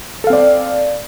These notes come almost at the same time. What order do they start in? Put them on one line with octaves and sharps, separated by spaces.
A4 F5 C4 D5